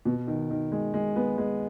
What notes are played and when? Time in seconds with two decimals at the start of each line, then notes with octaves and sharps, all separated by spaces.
0.05 B2
0.27 D#3
0.50 D#3
0.72 G#3
0.94 G#3
1.16 B3
1.38 G#3